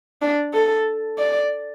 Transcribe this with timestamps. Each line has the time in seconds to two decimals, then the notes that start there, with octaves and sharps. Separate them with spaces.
0.22 D4
0.53 A4
1.18 D5